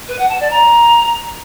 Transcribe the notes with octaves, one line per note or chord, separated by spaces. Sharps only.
B4
F#5
A5
D5
A#5